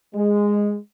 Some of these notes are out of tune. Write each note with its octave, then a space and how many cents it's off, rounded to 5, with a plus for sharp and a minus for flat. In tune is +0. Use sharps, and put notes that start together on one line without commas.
G#3 -10